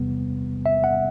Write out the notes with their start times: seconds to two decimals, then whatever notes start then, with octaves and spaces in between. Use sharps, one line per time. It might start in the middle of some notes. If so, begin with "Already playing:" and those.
Already playing: E2 C3 G3 B3
0.66 E5
0.84 F#5